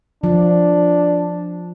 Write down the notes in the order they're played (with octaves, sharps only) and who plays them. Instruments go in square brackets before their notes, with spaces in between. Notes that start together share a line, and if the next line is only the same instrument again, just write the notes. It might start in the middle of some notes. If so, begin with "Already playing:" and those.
[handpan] F3 [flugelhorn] D4